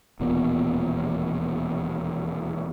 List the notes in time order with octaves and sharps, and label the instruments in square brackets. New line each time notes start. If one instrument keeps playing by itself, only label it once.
[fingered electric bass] E1 D#2 A#2 B3